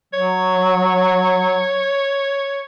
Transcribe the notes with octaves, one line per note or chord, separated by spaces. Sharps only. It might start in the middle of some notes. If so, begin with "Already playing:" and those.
F#3 C#5